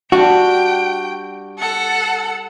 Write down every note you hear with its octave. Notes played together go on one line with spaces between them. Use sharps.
G3 D4 F#4 G5
A4 F#5